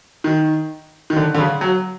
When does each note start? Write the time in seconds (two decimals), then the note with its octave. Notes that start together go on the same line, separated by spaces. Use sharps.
0.24 D#3
1.10 D#3
1.16 D3
1.34 D3
1.38 C#3
1.61 F#3